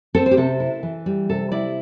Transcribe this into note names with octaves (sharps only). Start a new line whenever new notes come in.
C4 A4
C5
G4
C3 A4
E4
E3
G3
C3 A4
E4 D5